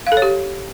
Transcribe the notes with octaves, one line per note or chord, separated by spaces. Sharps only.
F5
A4
C#5
G4